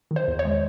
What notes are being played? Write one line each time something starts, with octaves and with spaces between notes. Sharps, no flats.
D#3
C5
E2
C#5
G#3